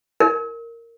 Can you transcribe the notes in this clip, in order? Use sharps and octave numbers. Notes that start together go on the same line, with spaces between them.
A#4